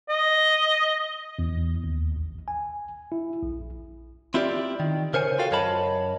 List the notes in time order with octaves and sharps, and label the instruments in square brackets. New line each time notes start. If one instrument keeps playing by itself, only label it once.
[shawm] D#5
[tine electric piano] E2
D#2
A1
G#5
E4
A#1
[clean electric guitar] C4 E4 F4 G4 A4 D5
D#3
C#3 A#4 C5 C#5 G#5
F4 F#4 A4 F5 G5
F#2 A#4 C#5 D#5 A5 B5